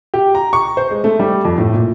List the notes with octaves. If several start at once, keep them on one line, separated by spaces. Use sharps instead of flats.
G4
A#5
C#6
C5
G#3
A3
G3
F2
A2
A#2